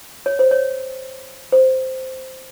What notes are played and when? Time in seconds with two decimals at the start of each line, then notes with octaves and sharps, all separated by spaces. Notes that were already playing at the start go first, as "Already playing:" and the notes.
0.26 C#5
0.39 C5
0.51 C#5
1.52 C5